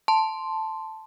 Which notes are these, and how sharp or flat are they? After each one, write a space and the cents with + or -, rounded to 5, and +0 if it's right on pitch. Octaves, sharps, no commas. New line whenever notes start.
A5 +0 C6 +0